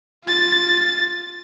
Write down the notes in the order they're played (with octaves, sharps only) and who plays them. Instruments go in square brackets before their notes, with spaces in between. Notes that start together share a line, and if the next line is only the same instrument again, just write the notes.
[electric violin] F4 A6